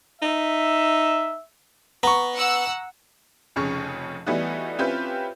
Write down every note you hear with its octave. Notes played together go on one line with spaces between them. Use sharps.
D#4 E5
B3 A#5 C#6
F#5 E6
F1 F2 C#3 C#4 C#6
E3 G3 A3 B3 D#4 F#4
C4 C#4 E4 F4 G4 B4